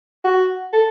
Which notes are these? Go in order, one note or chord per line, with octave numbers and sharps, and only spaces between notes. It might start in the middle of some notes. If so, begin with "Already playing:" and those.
F#4
A4